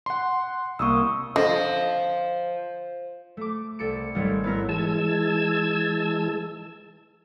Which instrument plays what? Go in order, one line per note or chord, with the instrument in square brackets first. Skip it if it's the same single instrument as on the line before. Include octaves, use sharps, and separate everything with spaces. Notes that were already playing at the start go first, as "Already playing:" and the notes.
[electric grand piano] F#5 C6
[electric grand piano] C2 A#3 [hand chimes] C#6 D#6 E6
[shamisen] D3 [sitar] F3 [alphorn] C5 [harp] D#5
[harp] A3 D6
C2 A4 C#7 D7
G#1 G3 A3 C#5 C#7
B3 E4 A#4
[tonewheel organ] E3 G#3 A5 E6 G#6